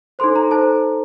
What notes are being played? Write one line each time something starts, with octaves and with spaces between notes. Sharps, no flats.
D#4 A4 C5 C6
A#5
D#4 A4 C5 A5